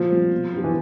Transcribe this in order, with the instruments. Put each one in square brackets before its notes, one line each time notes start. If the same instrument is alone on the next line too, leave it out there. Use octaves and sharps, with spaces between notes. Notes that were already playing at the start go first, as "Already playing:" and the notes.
Already playing: [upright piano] A#2 [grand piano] F3
[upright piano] G3 C4
B2
F#3 B3 D4 G4
[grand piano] E3